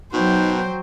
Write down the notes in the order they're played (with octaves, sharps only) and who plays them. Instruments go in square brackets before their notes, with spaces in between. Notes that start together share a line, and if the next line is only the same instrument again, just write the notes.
[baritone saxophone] B2 [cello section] F#3 [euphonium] D#4 [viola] C5 G5